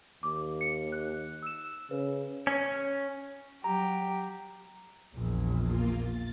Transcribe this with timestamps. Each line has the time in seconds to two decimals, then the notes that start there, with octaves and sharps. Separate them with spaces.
0.23 D#2 D6
0.61 C#7
0.92 F#6
1.42 E6 E7
1.91 C#3 B4
2.47 C#4
3.64 F#3 G4 A#5
5.15 A#1 E2
5.60 A#3 F4
6.00 A6